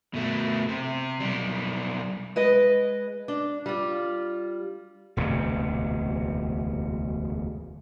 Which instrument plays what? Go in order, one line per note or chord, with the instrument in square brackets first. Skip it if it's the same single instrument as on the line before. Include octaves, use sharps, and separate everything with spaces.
[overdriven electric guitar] B2 A3
C3
B1 G3
[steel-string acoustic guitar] G#3 B4 D#5
D4
G3 F4
[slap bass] E1 D2 G2 C3